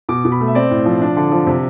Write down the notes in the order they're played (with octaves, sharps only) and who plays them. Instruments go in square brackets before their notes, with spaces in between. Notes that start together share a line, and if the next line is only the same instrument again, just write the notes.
[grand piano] B2 D6
B2
B5
A3
E5
C4 D5
A2
F3
D4
D3
F3
C3